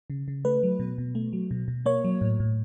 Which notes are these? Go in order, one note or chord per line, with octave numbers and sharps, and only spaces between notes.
C#3
C#3
A3 B4
F#3
B2
B2
A3
F#3
B2
B2
A#3 C#5
F#3
A2
A2